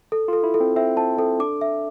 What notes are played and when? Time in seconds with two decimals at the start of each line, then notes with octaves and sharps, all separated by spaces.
0.12 A4
0.28 F4 A4
0.43 E4
0.54 A4
0.60 C4
0.76 C4 E5
0.97 C4 A5
1.18 C4 A4
1.39 D4 D6
1.61 E5